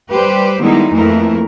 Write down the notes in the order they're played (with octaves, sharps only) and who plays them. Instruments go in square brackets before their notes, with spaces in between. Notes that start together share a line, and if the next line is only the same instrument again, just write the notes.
[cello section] G3 G4 B4 C5
D#3 G3 G#3 B3 D#4 E4
F2 E3 A3 A#3 E4 A#4